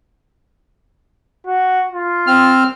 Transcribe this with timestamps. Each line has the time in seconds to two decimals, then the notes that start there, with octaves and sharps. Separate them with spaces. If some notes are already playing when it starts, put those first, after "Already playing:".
1.46 F#4
1.92 F4
2.27 C4 F6